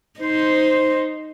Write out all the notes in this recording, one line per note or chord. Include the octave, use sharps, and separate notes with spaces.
D#4 C5